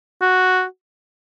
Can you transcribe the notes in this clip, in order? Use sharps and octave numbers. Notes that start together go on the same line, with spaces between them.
F#4